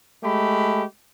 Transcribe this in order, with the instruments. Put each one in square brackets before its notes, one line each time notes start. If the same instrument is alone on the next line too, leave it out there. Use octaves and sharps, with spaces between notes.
[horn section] G#3 A3 G4 B5